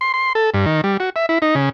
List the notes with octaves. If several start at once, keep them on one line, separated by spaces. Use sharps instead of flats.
C6
C6
A4
G2
D#3
G3
F#4
E5
E4
D#4
C#3